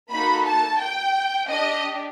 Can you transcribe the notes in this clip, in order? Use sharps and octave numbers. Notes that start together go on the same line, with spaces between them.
A#3 D#4 F#4 A4 B5
A5
G5
D4 G4 D#5